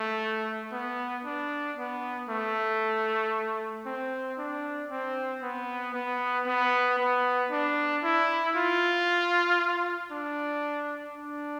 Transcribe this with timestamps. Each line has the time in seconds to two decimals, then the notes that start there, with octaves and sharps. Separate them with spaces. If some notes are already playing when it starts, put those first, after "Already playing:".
Already playing: A3
0.72 B3
1.24 D4
1.77 B3
2.29 A3
3.86 C4
4.38 D4
4.90 C4
5.42 B3
5.94 B3
6.46 B3
6.98 B3
7.51 D4
8.03 E4
8.55 F4
10.12 D4
11.16 D4